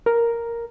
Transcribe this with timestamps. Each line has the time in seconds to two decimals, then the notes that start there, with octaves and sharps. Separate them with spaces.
0.06 A#4